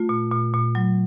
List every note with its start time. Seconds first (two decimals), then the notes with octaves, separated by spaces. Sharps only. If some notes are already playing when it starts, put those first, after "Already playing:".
Already playing: A3 F4
0.09 A#2
0.31 A#2
0.54 A#2
0.75 F#3